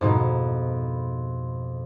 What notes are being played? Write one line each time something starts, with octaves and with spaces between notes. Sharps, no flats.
F2 G#2 B2